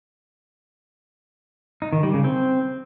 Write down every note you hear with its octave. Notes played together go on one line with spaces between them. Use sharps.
D#4
D#3
G3
C#3
C4